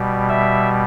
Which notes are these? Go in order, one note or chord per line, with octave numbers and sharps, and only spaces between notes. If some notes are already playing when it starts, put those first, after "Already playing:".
Already playing: B2 G3
E5